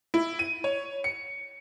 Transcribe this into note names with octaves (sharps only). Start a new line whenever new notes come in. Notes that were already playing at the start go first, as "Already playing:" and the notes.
E4
D#7
C#5
C#7